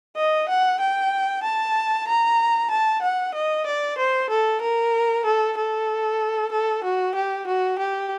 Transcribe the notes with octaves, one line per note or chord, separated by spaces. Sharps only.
D#5
F#5
G5
A5
A#5
A5
F#5
D#5
D5
C5
A4
A#4
A4
A4
A4
F#4
G4
F#4
G4